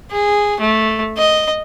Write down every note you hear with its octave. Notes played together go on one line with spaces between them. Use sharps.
G#4
A3
D#5